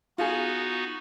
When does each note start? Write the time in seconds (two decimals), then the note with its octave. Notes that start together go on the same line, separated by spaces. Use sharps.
0.18 B3 D#4 F4 F#4 G#4